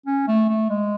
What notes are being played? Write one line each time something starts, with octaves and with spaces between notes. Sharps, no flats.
C#4
A3
A3
G#3